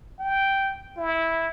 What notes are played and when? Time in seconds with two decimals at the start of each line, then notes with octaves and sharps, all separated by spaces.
0.20 G5
0.97 E4